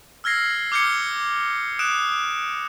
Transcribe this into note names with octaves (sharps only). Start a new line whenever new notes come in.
E6 F6 G#6 A#6 C7
D6 F6 G6 G#6 C#7 G7
D#6 F#6 D7 E7